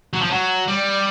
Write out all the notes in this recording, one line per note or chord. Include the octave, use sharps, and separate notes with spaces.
F#3
F3
F#3
G3